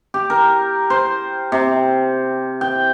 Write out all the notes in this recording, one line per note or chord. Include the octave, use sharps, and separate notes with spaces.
G4
A#4
C5
C3
G5